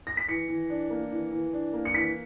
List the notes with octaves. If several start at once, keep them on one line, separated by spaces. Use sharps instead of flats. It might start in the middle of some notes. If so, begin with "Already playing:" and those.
A#6
B6
E3 C#7
E3
D4
A#3
E3
E3
D4
A#3
C#7
E3 B6